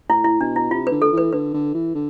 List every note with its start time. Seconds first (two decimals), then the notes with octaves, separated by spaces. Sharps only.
0.10 A2 E4
0.25 E4
0.41 B2 D4
0.56 E4
0.71 C3 F4
0.87 B4
0.91 D3
1.02 D3 A4
1.12 E3
1.18 B4
1.33 D3 B4
1.54 D3
1.74 E3
1.95 D3